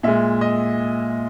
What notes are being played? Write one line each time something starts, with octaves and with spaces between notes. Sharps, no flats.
A#2 G#3 E5
D#5